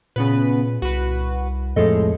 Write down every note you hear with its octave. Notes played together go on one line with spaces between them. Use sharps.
A#2 C#3 B3 B4
C2 F#4 B4
F2 A2 F3 G#3 A4 D#5